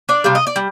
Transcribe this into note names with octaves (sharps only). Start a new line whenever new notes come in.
D4 D5
C3 G3 F5
D#5
D5
G3